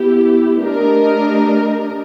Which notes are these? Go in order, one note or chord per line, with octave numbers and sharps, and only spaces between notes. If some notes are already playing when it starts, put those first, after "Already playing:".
Already playing: B3 E4 G4
A3 D4 G4 A#4 D#5